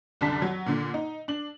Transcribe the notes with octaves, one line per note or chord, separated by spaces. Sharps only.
C2 F#2 D3 D4 A5 B6
F#3
A#2 D3
D#4
D4 F#7